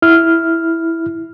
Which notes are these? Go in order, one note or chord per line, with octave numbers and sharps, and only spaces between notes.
E4 F6